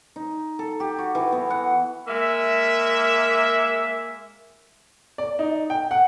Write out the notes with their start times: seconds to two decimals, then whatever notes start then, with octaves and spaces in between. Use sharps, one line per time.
0.16 D#4
0.59 A4
0.80 G4
0.98 F#4
1.15 E3
1.32 B3
1.50 F#5
2.07 G#3 A#3 E5
5.18 D5
5.39 D#4
5.70 G5
5.91 F#5